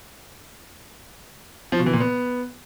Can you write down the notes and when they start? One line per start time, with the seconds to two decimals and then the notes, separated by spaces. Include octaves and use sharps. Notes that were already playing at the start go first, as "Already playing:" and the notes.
1.72 F3
1.79 B2
1.86 E3
1.93 A#2
2.00 B3